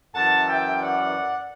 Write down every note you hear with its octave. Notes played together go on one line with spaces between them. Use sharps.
F#2 E3 F#5 A5
E5 G5
D5 F#5